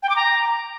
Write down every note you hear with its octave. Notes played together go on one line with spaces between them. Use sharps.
G5
D6
A#5